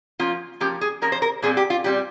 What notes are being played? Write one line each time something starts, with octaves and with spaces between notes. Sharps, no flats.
F3 A#3 C#4 F4
F3 A#3 C#4 G4
G#4
F3 A#3 C#4 A#4
C5
A#4
A#2 G3 C4 G#4
G4
F4
A#2 G3 C4 G4